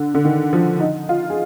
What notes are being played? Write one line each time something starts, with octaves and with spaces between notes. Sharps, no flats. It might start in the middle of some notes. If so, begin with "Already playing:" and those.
Already playing: D3
D3
D#3
F3
D#4
F4
G#4